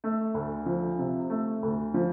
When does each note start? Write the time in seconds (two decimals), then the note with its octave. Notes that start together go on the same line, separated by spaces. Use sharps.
0.04 A3
0.34 D2
0.66 F3
0.99 C3
1.30 A3
1.63 D2
1.94 F3